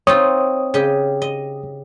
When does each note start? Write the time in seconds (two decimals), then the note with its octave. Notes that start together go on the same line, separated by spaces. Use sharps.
0.07 C4 D#4 F4 C#5 D#6
0.74 C#3 G4 D#5
1.22 D#5